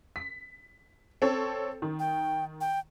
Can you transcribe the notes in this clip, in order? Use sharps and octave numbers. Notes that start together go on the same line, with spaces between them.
B6
C4 A4 C#5
D#3
G5
G5